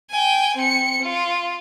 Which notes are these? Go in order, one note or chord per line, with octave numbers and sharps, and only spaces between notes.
G5 G#5
C4 C#7
F4